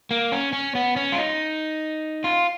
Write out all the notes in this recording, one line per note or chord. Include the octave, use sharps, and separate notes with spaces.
A#3
C#4
C#4
B3
C#4
F4
D#4
F4